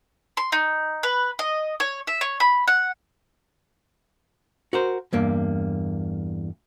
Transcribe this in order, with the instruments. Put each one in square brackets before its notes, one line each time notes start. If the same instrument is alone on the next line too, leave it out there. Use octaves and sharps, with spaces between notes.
[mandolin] C6
D#4
B4
D#5
C#5
E5
C#5
B5
F#5
[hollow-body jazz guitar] F#4 A#4 C5
E2 G2 A#3